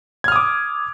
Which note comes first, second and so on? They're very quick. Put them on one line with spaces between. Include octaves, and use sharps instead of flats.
G#6 F6 D#6 D6